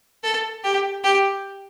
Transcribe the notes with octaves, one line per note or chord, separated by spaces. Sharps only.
A4
G4
G4